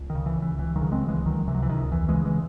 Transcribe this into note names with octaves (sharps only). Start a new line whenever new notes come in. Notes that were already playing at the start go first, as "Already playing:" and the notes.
Already playing: C#2
D#3
C#3
E3
C#2
E3
C#2 E3
D#3 F#3
C#3
G#3 C4
C#2
E3 G#3
C#2 D#3 F#3
C3 E3
F#3
E3
C#2 D#3
E2 E3
E3 G#3
C#3
E3 G#3